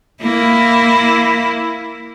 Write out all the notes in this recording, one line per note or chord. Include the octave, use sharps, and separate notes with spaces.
A#3 E4